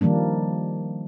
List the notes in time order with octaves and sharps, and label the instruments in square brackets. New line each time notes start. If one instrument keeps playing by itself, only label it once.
[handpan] D#3 F3 G3 A#3 D4